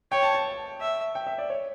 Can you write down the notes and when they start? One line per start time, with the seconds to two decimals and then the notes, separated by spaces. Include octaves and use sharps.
0.12 C#5 G5
0.23 A5
0.35 A5
0.81 E5
1.15 G5
1.27 E5
1.38 D5
1.50 C#5